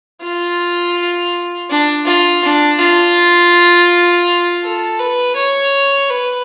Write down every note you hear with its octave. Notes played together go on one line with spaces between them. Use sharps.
F4
D4
F4
D4
F4
A4
B4
C#5
B4